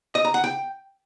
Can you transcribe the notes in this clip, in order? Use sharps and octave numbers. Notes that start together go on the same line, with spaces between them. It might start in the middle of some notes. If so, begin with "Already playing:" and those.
D#5
A#5
F#5
G5